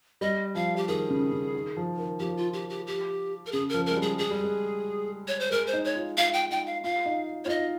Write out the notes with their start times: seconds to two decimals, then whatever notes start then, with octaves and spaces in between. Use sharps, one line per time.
0.21 G3 D#5
0.55 F3 F5
0.77 G4
0.88 D#3 G#4
1.10 C#3
1.32 C#3
1.55 D#3
1.77 F3
1.98 D#3
2.20 F3 G4
2.37 F4
2.53 G4
2.70 G4
2.87 G4
3.46 A#4
3.52 C#3 G#4
3.69 F3 A#4
3.86 G#3 A#4
3.96 G3
4.02 G#4
4.18 G#3 G#4
4.31 G3
4.43 G#3
5.28 C#5
5.40 C5
5.51 G#3 A#4
5.67 C5
5.73 D#4
5.85 C#5
5.95 F4
6.17 F4 F5
6.33 G5
6.51 D#4 G5
6.66 F5
6.84 F4 F5
7.05 D#4
7.45 F4 C#5
7.49 D#4 D#5